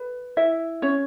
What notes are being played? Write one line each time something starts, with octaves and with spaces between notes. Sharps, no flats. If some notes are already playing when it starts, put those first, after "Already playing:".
Already playing: B4
E4 E5
C#4 C#5